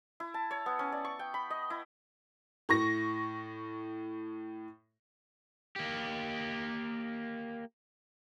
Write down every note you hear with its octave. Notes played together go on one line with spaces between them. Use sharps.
E4
A5
C#5
B3
C#4
D5
C#6
G5
B5
D#5
E4
A2 C#6 A#6
A#3 G4